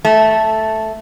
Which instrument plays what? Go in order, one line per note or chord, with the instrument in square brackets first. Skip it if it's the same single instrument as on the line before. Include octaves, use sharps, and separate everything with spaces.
[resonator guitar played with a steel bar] A3